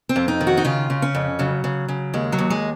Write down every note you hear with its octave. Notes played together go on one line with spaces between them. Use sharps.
C4
F2
D#4
D#3
F#4
D#4
C#3 F4
C#3
C#4
F2
C#3 F#3
C#3
C#3
D#2 G#3
F#3
D#2
G#3